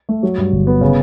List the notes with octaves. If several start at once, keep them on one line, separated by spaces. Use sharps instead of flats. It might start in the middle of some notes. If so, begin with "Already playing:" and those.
A3
F#3
G2
G1
B3
C#3